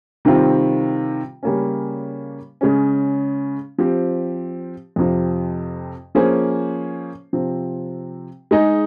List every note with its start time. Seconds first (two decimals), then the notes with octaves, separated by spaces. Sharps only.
0.25 C3 D#3 G3 C4 F4
1.43 C#3 G3 A#3 C#4
2.61 C#3 G#3 C#4
3.78 F3 C4 G4
4.96 F2 C3 F3
6.15 F3 A#3 C#4 G#4 C5
7.33 C3 F3 C4
8.51 G#3 D#4 G#4 D#5